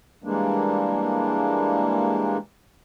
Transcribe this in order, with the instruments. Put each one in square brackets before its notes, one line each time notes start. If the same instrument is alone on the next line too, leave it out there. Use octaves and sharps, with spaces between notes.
[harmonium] E3 G3 G#3 A#3 D4